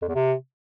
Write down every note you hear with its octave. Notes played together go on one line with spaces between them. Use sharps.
F2
E2
C3